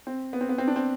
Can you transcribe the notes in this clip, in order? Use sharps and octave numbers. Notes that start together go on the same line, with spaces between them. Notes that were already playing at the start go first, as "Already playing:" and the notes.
C4
B3
C4
B3
C4
D4
C4